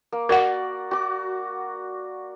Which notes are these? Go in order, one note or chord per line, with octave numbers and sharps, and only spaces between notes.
A#3
F#4 A#4 D5 F#5
F#4 D6